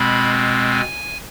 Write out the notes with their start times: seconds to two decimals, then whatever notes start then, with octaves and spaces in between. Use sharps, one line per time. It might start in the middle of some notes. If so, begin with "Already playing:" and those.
Already playing: B2 G#3 C4 B5
0.71 G#5